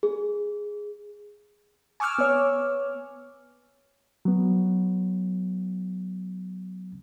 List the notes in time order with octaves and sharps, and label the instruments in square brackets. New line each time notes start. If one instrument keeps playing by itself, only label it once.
[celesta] G#4
[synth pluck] G#5 C#6 D6 E6 F6
B3 C#5
[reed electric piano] F#3 B3